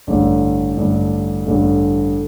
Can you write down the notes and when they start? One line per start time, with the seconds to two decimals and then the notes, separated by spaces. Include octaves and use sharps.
0.07 A1 G2 D3 A3
0.76 A1 G2 D3 A3
1.46 A1 G2 D3 A3